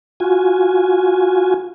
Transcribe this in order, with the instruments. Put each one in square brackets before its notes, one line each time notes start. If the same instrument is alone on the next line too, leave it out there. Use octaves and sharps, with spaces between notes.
[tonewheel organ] F4 F#4 G#5